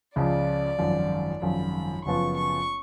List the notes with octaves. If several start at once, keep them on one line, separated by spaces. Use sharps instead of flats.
C#2 C#3 F3 D5
G#1 F#2 F3
G#1 F#2 F3 B5
F#1 F#2 F3 B3 F4 C#6
C#6